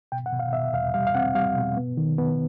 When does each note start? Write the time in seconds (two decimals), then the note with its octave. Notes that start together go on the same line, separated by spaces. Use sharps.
0.12 B2 G5
0.26 F#5
0.33 B2
0.39 F5
0.53 B2 E5
0.74 E2 F5
0.94 G3 F5
1.07 F5
1.15 C4 F#5
1.35 G3 F5
1.56 B2
1.77 B3
1.97 D#3
2.18 B3